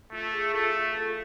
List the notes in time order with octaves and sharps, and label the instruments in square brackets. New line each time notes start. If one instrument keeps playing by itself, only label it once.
[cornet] A3 [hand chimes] F4
[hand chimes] G#4
[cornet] A3 [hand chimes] F4 A4
[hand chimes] F4 A4